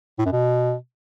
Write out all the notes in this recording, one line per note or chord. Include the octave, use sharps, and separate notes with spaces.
A2
F#2
B2